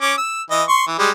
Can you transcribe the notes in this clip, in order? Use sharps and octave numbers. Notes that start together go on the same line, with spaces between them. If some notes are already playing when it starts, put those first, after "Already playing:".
C#4 D6
E6
E3 D#5
C6 C#6
E3
G3 G#3